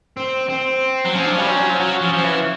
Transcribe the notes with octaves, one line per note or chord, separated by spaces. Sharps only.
C4
C4
F#3
F3 C#4
D4
G3 C#4
F#3
F3
F#3
F3
F3
E3